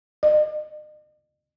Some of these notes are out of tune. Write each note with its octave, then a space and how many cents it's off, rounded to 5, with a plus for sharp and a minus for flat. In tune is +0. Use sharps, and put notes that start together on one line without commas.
D#5 -45